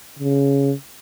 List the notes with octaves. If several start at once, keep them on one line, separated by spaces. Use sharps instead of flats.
C#3